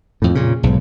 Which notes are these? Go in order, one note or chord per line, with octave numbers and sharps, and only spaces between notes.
F2 A2
A#2 C#3
B1 G#2